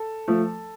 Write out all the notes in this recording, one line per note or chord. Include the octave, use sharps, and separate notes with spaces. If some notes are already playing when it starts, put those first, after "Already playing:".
Already playing: A4
F3 A3